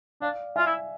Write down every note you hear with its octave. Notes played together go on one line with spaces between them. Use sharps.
D4 D5 F5
F4 E5 G#5
E4